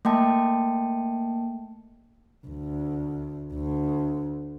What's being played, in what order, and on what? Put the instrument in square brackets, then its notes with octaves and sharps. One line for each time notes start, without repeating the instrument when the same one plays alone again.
[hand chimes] A3 A#3 G5 A5
[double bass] D2
D2